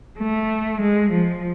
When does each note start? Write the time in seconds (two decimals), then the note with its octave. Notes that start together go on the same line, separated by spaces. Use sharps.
0.19 A3
0.81 G#3
1.12 F3